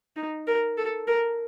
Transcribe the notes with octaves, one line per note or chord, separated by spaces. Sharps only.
D#4
A#4
A4
A#4